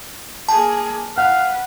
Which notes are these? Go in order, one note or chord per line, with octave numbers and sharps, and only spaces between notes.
A#3 G#4 A5
B4 F5 F#5